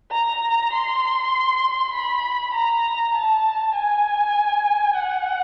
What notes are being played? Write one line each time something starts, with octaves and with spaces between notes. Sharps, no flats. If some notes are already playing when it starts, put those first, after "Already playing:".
A#5
C6
B5
A#5
A5
G#5
F#5